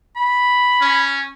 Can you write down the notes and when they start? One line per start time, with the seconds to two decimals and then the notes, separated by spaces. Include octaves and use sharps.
0.16 B5
0.81 C#4